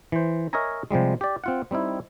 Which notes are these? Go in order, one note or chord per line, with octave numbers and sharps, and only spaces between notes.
E3 C5
A#4 C#5 D#5 E5 G#5 A#5
C3 F3 G3 G#3
G4 D5
C4 F4 F#5
G3 C4 D#4 E4